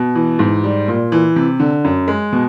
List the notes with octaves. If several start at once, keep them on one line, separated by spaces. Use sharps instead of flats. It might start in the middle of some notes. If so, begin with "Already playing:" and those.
Already playing: B2
E3
G#2
G3
A#2
E3
C3
D3
F#2
G#3
B2